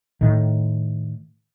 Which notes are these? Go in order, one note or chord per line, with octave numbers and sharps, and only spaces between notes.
A2 D#3